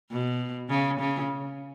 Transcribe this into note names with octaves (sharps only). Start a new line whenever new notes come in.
B2
C#3
C#3